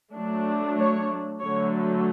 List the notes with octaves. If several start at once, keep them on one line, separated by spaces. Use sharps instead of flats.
F#3 A3 D4
C#5
D3 F#3 A3 C#5